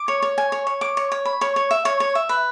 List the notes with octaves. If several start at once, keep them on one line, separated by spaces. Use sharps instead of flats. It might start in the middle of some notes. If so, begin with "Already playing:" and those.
Already playing: D6
C#5
C#5
G#5
C#5
C#5
D6
C#5
C#5
B5
C#5
C#5
E5
C#5
C#5
E5
B4